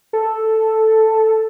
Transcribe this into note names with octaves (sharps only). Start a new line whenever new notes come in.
A4